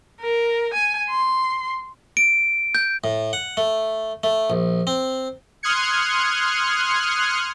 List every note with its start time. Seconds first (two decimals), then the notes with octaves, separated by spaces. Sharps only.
0.20 A#4
0.74 G#5
1.10 C6
2.17 D7
2.75 G6
3.04 A2
3.33 F#5
3.57 A3
4.23 A3
4.50 A#1
4.87 C4
5.63 C6 D#6 F6 F#6 G#6 C#7